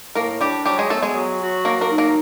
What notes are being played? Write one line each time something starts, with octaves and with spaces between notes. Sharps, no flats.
A2 A#3 A#4
G3 D4 G4
F#3 G3 G4
G#3 G#4
A3 B3 A4
G#3 G#4
F#3
F#4
F#3 A#3 A#4
A#3 A#4
D#4
A#3 A#4